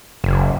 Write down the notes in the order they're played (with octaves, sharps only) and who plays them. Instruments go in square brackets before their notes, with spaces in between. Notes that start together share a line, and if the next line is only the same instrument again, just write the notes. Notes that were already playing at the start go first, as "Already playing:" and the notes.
[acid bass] F#1